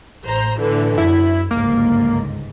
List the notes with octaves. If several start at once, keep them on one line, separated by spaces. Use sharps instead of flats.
A1 C5 A#5
A2 D3 E3
F#2 E4
G1 C#2 G#2 A#3